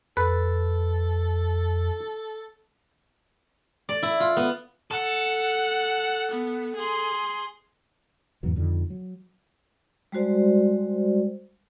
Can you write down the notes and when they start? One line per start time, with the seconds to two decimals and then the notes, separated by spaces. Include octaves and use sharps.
0.17 F2 A4 B4
3.89 D5
4.03 E4
4.20 F4
4.37 B3
4.91 A4 F#5
6.31 B3
6.76 G#4 C6
8.43 E2 G#2 E3 F#3
8.56 F2 D3 D#3
8.90 F#3
10.12 G3 G#3 F#4 C5 D5